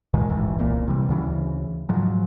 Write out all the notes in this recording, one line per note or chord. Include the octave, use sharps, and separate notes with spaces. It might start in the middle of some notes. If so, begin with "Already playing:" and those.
C#2 A#2 D#3 G#3
D#1 A1 G#2 E3
D1 C2 A#2 A#3
C3 E3 G3
D2 C#3 E3
G#2 F3 F#3